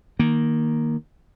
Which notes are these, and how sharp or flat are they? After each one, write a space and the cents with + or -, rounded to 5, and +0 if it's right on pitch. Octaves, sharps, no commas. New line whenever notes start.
D#3 +0 A#3 +0